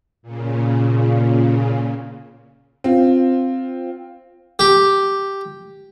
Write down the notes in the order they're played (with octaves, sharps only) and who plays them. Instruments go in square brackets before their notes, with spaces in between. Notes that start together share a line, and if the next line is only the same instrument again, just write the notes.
[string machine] A#2 C#3
[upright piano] C4 F4
[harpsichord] G4